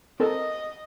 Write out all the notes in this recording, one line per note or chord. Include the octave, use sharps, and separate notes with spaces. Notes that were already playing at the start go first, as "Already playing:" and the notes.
C4 A4 A#4 D#5